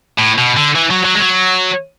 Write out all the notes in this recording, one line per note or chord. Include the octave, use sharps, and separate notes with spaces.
A2
B2
D3
E3
F#3
F#3
G#3
F#3